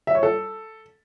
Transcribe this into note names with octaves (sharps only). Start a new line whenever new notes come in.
E5
C#5
A4